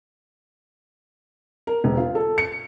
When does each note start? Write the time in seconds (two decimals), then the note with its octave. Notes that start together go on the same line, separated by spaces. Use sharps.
1.67 A#4
1.84 E1
1.97 F4
2.15 A4
2.38 C#7